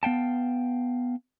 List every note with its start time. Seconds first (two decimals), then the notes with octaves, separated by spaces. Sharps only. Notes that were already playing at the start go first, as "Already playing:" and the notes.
0.03 B3 F5 G5 A5